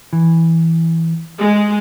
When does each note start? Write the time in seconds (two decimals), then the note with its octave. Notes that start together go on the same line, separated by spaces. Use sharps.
0.13 E3
1.38 G#3